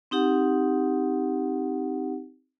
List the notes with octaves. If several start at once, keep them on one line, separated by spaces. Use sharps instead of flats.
C4 D#4 G4 F#5